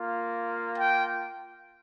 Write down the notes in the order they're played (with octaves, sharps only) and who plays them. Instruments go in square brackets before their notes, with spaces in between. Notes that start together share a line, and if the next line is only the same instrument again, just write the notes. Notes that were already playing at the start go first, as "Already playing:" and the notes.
Already playing: [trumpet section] A#3 F4
G5